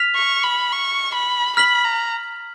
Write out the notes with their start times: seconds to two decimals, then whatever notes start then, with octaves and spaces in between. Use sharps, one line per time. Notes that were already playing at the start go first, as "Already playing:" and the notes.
Already playing: F6 B6 F7
0.16 C#6
0.43 B5
0.72 C#6
1.14 B5
1.56 B5 F6 B6 F#7
1.84 A#5